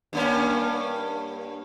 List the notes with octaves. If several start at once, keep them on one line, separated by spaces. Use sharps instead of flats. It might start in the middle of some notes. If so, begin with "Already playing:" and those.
G2 A#3 C#4